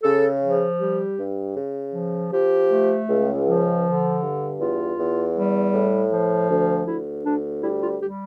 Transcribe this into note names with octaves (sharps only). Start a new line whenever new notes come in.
C#3 A4
F3
G3 G4
G2
C#3
F3
F3 G4
A3
C#2
F3
D3
G2
E2 F4
E2
G3
A2
F3
D2
D2 E4
D2 D4
G3 E4
F4
G3 G4